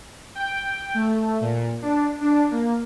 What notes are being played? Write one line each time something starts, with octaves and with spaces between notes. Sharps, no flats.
G5
A3
A#2
D4
D4
A#3